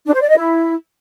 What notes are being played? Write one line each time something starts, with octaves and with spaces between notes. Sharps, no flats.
D4
C5
D5
D#5
E4